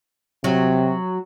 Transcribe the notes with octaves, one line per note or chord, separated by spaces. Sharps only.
C3 F#3